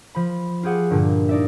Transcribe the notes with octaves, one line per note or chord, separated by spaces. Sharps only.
F3 B5
F4 G4 G#4 F#5
G2 A#2 D3
D#4 D5 E5